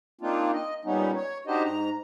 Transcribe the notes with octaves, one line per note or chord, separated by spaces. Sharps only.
A#3 C4 D4 D#4 F4
D#5
A#2 G3 B3 C#4 D#4
C#5
D4 D#4 F#4 G4 C5 D#5
G#2 A#5